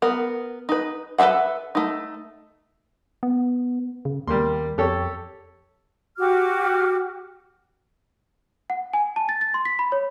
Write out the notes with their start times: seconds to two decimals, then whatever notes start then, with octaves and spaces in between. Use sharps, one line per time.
0.02 B3 A#4
0.69 D#4 B4
1.18 A4 B4 D5 E5 F#5
1.75 A3 D#4
3.23 B3
4.05 C#3
4.28 D#2 G3 A#3 C6
4.78 F2 G4 A4 C#5
6.18 F#4 G4 D6 F6
8.70 F#5
8.93 G#5
9.16 A5
9.29 A6
9.41 A6
9.54 C6
9.65 B6
9.79 B5
9.92 C#5